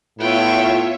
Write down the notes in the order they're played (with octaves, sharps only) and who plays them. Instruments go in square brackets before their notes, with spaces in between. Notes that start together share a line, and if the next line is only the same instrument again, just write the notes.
[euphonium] A2 [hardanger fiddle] B3 G5 [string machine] F4 C#5 E5